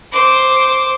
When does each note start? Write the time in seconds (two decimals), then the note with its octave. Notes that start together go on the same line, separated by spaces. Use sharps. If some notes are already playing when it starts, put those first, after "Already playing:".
0.12 C5 D6